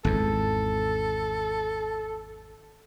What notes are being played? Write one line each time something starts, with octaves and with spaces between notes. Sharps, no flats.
G#1 E2 A4